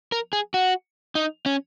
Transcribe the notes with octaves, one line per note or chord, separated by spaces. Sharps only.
A#4
G#4
F#4
D#4
C#4